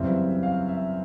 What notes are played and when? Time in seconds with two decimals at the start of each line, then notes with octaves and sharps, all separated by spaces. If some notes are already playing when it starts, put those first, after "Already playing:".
Already playing: F#2 C#3 E3 G3 C4 E5
0.43 F5
0.69 E5